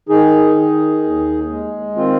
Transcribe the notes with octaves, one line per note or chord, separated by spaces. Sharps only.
D#3 D#4 G#4
D#3
D#2
G#3
D#3 C4 F4